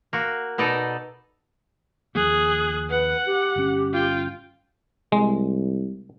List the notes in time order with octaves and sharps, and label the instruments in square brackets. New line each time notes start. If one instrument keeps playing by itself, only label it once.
[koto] A#3 F#4
B2 D#4 A4 D5 D#5 A#5
[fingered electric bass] D#2 F3 A#3 [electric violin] G#4 F#6
[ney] B4 [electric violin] F#5
[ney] G4
[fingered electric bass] G1 C#4
[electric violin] F4 G5
[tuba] C2 [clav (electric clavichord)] G#3